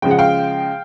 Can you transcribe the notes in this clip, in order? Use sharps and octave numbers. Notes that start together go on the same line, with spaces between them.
C#3 F3 G#3 G5
F#5
F5 G5